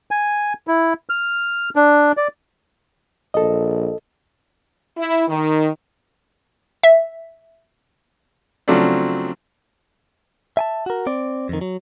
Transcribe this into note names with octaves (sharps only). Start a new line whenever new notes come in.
G#5
E4
F6
D4
D5
A#1 A4 D#5
E4
D#3
E5
C#3 F3 F#3 A3 C4 D4
E5 G#5 A5
F#4 A#4
C4 D5
F2 D#3
F#3